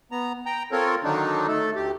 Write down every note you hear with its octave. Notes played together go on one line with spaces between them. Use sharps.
B3 A#5
G5 A#5
C4 F4 A4 A#4 C#5
D3 D#3 F#3 D4 D#4
A3 A4
D2 G4